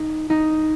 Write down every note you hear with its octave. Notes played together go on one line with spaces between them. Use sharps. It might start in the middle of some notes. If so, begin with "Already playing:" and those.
Already playing: D#4
D#4